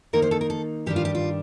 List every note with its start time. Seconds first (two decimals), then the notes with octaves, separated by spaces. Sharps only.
0.13 D#3 A#3 D#4 A#4
0.22 C5
0.31 A4
0.41 A#4
0.50 A4
0.86 G2 D#3 G3 D4 G4
0.96 F4
1.05 G4
1.15 F4